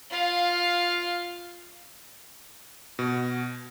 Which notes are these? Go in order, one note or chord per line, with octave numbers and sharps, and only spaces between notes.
F4 F5
B2